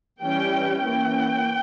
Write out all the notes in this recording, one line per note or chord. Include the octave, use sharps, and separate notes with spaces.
E3 G3 C#4 G5
E3 A#3 C#4 G5